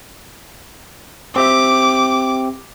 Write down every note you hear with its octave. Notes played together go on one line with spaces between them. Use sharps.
C4 G4 E5 D6